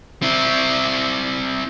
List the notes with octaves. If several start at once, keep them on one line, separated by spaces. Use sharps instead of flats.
C4 E4